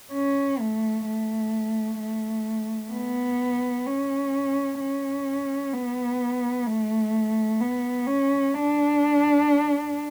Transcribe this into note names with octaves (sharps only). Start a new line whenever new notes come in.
C#4
A3
A3
A3
B3
C#4
C#4
B3
A3
B3
C#4
D4